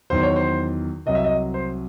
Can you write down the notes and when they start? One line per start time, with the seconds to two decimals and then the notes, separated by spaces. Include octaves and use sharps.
0.10 E2 D#3 F#3 C5
0.23 C#5
0.36 C5
1.06 C2 C3 F#3 D#5
1.15 E5
1.24 D#5
1.54 C5